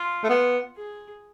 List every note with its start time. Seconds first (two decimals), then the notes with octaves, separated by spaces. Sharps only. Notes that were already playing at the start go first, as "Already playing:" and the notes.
Already playing: F4
0.24 A3
0.30 B3
0.77 G#4